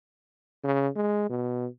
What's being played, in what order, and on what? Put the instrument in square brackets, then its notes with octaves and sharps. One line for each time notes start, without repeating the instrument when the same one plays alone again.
[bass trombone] C#3
G#3
B2